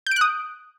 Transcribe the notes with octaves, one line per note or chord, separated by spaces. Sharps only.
D#6 F#6 G6 D7